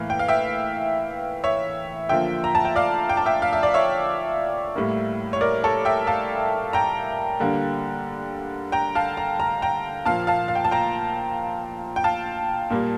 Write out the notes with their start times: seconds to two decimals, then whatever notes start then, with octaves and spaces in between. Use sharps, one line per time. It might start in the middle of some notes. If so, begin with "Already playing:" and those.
Already playing: A2 E3 A#3 F5
0.10 G5
0.19 F5
0.28 E5 G5
1.44 C#5 E5
2.09 D3 F3 A#3 E5 G5
2.44 A#5
2.55 A5
2.65 G5
2.76 D5 F5
3.09 G5
3.17 A5
3.26 E5 G5
3.42 F5
3.53 E5
3.63 D5
3.74 C#5 E5
4.75 A2 G3 A#3
5.33 C#5
5.41 A#4 D5
5.64 A4 C#5
5.85 E5 G5
6.07 F5 A5
6.73 G5 A#5
7.40 D3 G3 A#3
8.72 G5 A#5
8.95 F5 A5
9.17 A#5
9.40 A#5
9.62 G5 A#5
10.05 A#2 F3 A#3 F5 A5
10.27 F5 A5
10.48 F5
10.55 G5
10.64 A5
10.71 G5 A#5
11.96 G5
12.04 F5 A5
12.70 A#2 G3 A#3